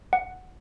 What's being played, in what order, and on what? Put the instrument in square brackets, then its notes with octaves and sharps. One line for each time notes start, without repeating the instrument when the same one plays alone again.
[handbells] F#5